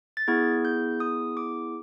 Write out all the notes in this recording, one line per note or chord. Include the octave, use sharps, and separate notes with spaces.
A6
B3 E4 G#4 G#6
G6
D#6
D6